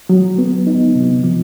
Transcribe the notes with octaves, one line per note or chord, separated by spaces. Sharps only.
F#3
B3
D#4
C3
F3